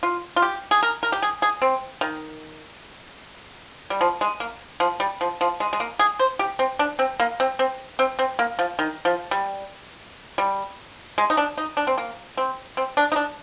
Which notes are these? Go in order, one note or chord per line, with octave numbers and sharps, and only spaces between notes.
F4
F4
G4
G#4
A#4
A#4
G4
G#4
G#4
C4
D#3
G3
F3
G#3
A#3
F3
G3
F3
F3
G#3
G#3
A#3
G#4
C5
G4
C4
D4
C4
A#3
C4
C4
C4
C4
A#3
F3
D#3
F3
G3
G3
G#3
D#4
D4
D#4
D4
C4
A#3
C4
C4
D4
D#4
D4